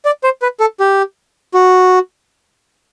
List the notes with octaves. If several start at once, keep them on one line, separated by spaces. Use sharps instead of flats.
D5
C5
B4
A4
G4
F#4